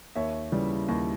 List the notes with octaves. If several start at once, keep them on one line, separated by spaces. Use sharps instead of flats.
D#2 C#5 E5
C#3 E3 G3
D#2